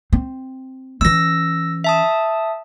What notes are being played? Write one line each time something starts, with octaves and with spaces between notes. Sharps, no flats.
C4
E3 C#4 E6 A#6
E5 A5 D#6